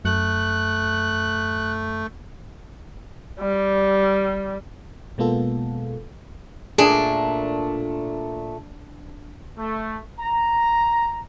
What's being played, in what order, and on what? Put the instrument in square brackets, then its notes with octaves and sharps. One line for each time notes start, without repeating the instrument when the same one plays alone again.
[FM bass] F#2 [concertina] A3 [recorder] F#6
[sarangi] G3
[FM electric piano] B2 G#3 A#3 B3 F4 A4
[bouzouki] A#2 A3 [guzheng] D4 [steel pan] G#4
[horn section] A3
A#5